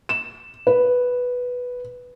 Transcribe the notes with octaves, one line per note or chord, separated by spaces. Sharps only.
E7
B4